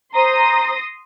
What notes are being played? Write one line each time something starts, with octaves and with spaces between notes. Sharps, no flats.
C5 A#5 C6 D#6 A#6